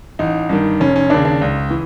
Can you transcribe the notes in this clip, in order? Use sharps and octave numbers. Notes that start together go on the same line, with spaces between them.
A1 D#4
G2 D#3
F1 C#4
C#4
D#2 C#3 D4
D4
C#2
E3